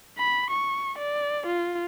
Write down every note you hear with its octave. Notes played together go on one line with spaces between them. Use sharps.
B5
C#6
D5
F4